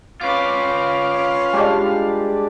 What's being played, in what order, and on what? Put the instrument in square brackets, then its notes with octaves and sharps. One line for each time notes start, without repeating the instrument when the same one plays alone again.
[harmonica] C#4 [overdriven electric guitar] F4 B4 [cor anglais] F5 [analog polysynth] D6
[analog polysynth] G3 G#3 D4